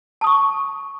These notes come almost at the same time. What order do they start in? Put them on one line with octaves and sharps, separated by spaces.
A5 D#6 C#6